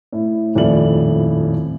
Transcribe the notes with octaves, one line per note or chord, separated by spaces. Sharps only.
A2
D#1 F2 A2 E4 D5 F#7